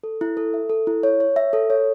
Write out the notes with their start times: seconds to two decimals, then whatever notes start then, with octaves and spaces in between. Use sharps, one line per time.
0.03 A4
0.21 E4
0.37 A4
0.54 E5
0.70 A4
0.87 E4
1.03 C#5
1.20 C#5
1.36 E5
1.53 A4
1.70 C#5